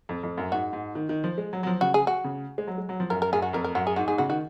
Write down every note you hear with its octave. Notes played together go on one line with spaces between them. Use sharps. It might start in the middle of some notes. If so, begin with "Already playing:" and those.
F2
F2
F#2
G#2 F#4
G#2
D#3
D#3
F3
G#3
F#3
F#3
F3
C#3 F#4
G#4
F#4
C#3
G#3
F#3
G#3
F#3
F3
F#2 A#4
A#4
F#2 G#4
F#4
F2 A#4
A#4
F#2 F#4
G#4
G#2 F#4
G#2 G#4
C#3 F#4
D#3 F#4